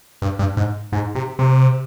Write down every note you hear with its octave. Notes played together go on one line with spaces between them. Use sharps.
G2
G2
G#2
G#2
C3
C3